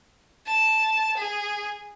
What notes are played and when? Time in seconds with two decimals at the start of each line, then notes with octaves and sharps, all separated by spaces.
0.47 A5
1.17 G#4